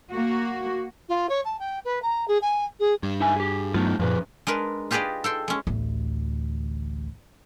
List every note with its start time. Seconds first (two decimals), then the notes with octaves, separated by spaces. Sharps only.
0.11 A#3 F#4
1.09 F4
1.29 C#5
1.45 A5
1.59 G5
1.85 B4
2.02 A#5
2.28 G#4
2.41 G#5
2.80 G#4
3.03 G2
3.20 D#4 E5 G#5
3.36 G4 G#4
3.74 G2 F#3 A3 B3 D#4 F4
3.99 F#2 A#2 F3 G#4 B4
4.47 G#3 D4 A#4 B4
4.91 F4 G4 G#4 B4 D5 D#5
5.24 A4 G5 C6
5.48 G#3 C#4
5.67 A1 D2